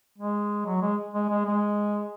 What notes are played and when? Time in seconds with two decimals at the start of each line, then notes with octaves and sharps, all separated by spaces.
0.18 G#3
0.66 F#3
0.81 G#3
1.14 G#3
1.30 G#3
1.45 G#3